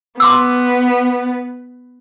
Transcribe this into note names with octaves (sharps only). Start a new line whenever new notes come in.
B3 C6 D6 E6